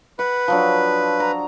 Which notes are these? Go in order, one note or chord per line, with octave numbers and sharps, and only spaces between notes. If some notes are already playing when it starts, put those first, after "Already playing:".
B4 F#5
F3 F#3 D4
A#5